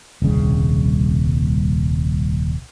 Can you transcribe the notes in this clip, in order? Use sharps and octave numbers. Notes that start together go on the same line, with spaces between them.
D#1 C2 C#3